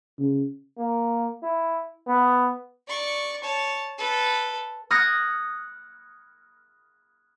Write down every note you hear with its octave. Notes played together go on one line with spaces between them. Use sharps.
C#3
A#3
E4
B3
D5 C#6
C#5 A5
A4 B4
D#6 F6 F#6 G#6 A#6 C#7